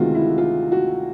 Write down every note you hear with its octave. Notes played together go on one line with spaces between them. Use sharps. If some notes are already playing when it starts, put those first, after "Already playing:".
Already playing: D2 C3 D#3 G#3 B3 F4 F#4
E4
F4
F#4